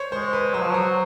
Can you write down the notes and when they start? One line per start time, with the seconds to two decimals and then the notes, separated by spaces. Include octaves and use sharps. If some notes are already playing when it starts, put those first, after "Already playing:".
Already playing: C5 C#5
0.12 G#3 C5
0.33 B4
0.54 F#3 C5
0.62 F3
0.71 F#3 C5